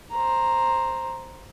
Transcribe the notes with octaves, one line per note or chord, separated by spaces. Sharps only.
C5 A#5